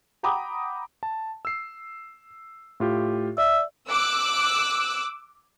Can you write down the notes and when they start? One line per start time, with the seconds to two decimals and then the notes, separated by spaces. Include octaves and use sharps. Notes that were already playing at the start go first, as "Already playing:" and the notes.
0.23 F#5 G5 A#5 B5 D6 D#6
1.03 A5
1.45 E6 C7
2.80 A2 F4 G4
3.38 D5 E5
3.88 D6 E6 F#6